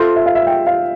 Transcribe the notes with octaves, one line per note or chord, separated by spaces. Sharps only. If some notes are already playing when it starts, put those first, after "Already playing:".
Already playing: F4 A4 C5 E5
E5
F5
E5
G5
F5